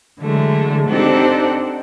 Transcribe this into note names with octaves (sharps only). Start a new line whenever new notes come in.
D3 E3 F#3 G#3 A3
C4 D4 D#4 G4 A4 F#5